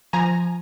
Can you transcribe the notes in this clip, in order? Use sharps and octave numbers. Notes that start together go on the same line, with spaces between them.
F3 G#5 A#5